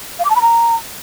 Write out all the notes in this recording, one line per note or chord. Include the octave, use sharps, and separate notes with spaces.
F5
D6
A5
B5
A#5